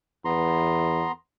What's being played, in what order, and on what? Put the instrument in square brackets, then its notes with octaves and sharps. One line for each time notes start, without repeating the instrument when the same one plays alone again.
[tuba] E2 [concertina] B3 A#5 C6